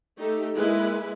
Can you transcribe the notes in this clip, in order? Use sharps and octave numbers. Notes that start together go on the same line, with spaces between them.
A3 D#4 G4 A4
G#3 A#3 E4 B4